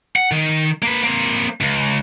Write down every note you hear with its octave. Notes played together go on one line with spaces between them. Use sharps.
F#5
D#3
A#3 B4
A#3 C4
C#2